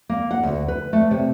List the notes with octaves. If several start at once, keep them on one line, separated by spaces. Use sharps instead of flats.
A#3
F#5
D2
B4
A3
C3